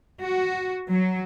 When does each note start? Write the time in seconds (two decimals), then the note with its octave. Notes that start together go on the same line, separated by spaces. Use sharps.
0.22 F#4
0.89 F#3